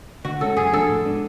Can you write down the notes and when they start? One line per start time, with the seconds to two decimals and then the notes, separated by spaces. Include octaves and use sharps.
0.25 D3 F#4
0.41 G#3 C#4 A4
0.57 F#2 G#4
0.73 F3 A3 D4 A4
0.89 A2
1.05 G#3 B3 D4